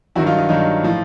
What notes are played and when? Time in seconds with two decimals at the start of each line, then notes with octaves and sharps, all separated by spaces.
0.15 G2 D#3 F#3 E4 F#4
0.26 D#4 F4
0.38 D#4
0.49 G2 D#3 F#3 D#4
0.83 A2 F3